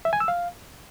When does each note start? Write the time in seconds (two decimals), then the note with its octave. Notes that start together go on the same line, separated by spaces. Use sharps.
0.05 E5
0.13 G#5
0.20 E6
0.28 F5